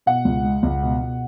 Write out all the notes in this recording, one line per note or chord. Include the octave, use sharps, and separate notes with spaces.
B2 F#5
C#2
G#3
C#2
B2
B2